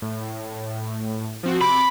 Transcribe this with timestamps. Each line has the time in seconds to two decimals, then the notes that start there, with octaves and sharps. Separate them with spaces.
0.02 A2
1.43 F3 C4 F#4
1.61 C3 B5 D6